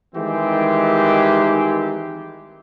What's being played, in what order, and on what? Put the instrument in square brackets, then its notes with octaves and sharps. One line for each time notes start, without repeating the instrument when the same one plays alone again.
[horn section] D#3 E3 G3 G#3 C4 G4